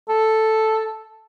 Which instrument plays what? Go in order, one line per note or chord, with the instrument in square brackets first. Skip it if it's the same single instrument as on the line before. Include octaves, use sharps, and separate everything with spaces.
[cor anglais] A4